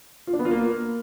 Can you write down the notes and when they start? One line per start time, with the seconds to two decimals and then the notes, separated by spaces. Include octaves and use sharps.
0.27 F4
0.33 D4
0.39 B3
0.45 F4
0.51 A#3